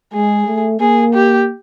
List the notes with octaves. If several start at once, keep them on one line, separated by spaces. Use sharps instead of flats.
G#3 G#4
A3
A#3 G#4
G4